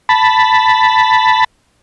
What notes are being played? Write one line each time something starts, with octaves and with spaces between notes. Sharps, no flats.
A5 B5